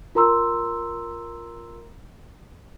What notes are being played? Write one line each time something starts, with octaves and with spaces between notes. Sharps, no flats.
F4 A#4 A#5 C6 E6